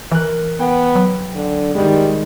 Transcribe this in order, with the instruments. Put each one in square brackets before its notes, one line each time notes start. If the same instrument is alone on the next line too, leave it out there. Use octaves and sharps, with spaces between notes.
[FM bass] E3 [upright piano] A#4 F#6
[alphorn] B3 [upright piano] G5
[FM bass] F#3
[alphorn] D3
[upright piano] D#3 G#3 [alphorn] G3